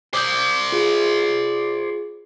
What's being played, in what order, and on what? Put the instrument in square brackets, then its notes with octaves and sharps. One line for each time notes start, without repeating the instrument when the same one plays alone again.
[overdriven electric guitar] C5 D5 [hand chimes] D6 D#6 G6
[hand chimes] F4 G#4